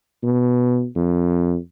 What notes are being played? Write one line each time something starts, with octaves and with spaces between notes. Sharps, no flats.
B2
F2